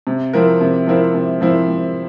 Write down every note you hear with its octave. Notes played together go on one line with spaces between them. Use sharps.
C3
F3 C4 E4 A#4
C3
F3 C4 E4 A#4
C3
F3 C4 E4 A#4
C3